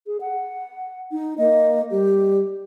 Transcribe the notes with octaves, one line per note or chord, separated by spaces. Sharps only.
G#4
F#5
D#4
A#3 D#5
G3 G4